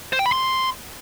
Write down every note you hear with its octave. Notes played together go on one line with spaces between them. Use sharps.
C5
G5
B5
C6